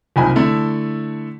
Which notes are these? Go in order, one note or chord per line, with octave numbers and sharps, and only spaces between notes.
F#1 C2 F3 D#4 G#5 B5
D3 A3 E4